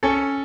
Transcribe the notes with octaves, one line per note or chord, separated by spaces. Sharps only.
C#4 A4